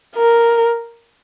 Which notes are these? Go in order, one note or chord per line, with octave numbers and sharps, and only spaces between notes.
A#4